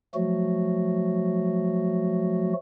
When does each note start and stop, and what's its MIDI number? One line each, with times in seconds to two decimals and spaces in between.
0.14 2.53 53
0.14 2.53 54
0.14 2.53 57
0.14 2.53 66